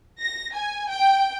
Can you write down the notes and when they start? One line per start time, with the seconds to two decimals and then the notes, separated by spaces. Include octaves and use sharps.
0.20 A#6
0.53 G#5
0.89 G5